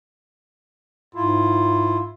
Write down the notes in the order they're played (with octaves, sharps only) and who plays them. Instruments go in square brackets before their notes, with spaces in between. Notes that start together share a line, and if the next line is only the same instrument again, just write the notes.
[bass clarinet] G#2 [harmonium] E4 F4